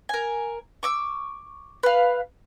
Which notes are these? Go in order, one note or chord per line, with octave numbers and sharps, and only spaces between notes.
A#4 G#5
C#6 D6 E6
B4 F5